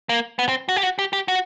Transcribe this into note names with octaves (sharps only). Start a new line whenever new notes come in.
A#3
B3
C4
F#4
G4
F#4
G4
G4
F#4